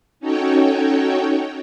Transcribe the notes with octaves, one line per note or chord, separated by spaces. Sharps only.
C#4 D#4 F#4 A4 C#5 G5